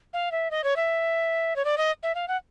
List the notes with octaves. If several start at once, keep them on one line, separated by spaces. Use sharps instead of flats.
F5
E5
D#5
C#5
E5
C#5
D5
D#5
E5
F5
F#5